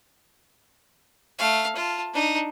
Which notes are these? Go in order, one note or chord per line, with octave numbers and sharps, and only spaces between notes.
A3 F5
F4 A5
D4 D#4